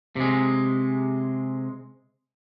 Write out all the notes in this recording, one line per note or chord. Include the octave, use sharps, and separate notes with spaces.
C3 G#3